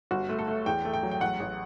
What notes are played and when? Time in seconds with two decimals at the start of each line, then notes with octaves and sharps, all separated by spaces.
0.11 G1 F#4
0.29 A3
0.39 A4
0.48 A3
0.66 E2 G5
0.85 A3
0.93 G5
1.03 F#3
1.11 G5
1.21 A1 F#5
1.40 A1